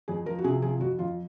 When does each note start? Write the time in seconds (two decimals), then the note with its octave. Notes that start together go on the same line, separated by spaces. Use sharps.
0.08 F2 G#4
0.26 F3 A#4
0.38 F#4
0.44 C3 G#4
0.62 F3 G#4
0.80 F2 F#4
0.99 F2 F4